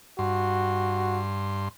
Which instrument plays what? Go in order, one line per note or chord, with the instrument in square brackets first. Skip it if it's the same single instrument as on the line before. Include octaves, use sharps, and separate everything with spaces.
[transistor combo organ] G2 C6 [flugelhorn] F#4